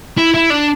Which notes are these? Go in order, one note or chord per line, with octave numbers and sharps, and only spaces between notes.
E4
E4
D4